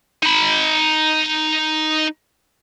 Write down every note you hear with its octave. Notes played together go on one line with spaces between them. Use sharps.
D#4 B5